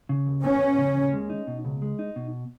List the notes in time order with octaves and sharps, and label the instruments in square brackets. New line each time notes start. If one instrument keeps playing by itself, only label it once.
[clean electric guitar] C#3
D#2
[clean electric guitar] B3 [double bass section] C#4
[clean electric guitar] D#2
C#3
D#2
G#3
D#4
B2
C#2
G#3
D#4
B2